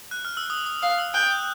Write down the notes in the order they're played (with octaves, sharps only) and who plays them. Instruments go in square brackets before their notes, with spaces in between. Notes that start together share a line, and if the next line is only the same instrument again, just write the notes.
[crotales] F#6
F6
E6
D#6
D#6
[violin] F5 [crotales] D#6
[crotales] E6
[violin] G5 [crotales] F#6
[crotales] G6